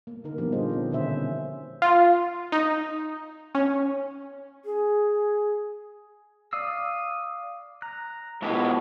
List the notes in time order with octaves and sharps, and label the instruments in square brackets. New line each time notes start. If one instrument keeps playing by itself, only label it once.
[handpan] A#3
D3 D#4 A#4
A#2 F3 G3 B3 D4 G4
G4 G#4 C5 D#5
D3 C4 C#4
B2 D#3 C#4 C5 E5
[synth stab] F4
D#4
C#4
[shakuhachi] G#4
[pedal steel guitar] D5 F5 E6 [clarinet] D#6
[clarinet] A#5 [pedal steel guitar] F#6
[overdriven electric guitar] G#2 B2 [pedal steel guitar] G4 A5 [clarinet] G#4